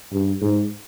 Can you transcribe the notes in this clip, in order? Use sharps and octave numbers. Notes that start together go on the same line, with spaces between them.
G2
G#2